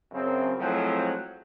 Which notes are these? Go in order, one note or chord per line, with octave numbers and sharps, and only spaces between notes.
F#2 C#3 C4
A2 F3 F#3 G#3 A3 C4